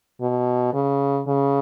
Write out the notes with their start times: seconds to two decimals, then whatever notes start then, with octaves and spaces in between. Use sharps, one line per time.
0.21 B2
0.74 C#3
1.27 C#3